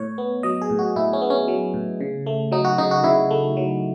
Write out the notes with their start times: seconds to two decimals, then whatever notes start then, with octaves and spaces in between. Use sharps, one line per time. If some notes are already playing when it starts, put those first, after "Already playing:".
Already playing: A2 C#5
0.18 B3
0.43 F#3 D#5
0.62 G#4
0.70 A2
0.79 F#4
0.96 A2 E4
1.13 C#4
1.21 B3
1.30 C#4
1.48 F#3
1.74 A2
2.01 C#3
2.26 A3
2.52 F#3 D#4
2.65 F#4
2.78 C#3 D#4
2.91 F#4
3.04 C#3 E4
3.31 A3
3.57 F#3